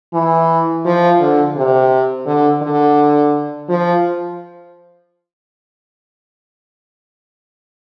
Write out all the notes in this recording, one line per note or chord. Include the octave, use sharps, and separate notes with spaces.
E3
F3
D3
C3
D3
D3
F3